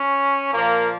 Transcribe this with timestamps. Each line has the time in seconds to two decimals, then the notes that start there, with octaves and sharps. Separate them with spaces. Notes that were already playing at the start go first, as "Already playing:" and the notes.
Already playing: C#4
0.52 A#2 F3 A#3